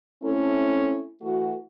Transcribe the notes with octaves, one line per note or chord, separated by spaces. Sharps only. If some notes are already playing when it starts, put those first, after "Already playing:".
A3 C4 C#4 E4 A4
E3 A3 F#4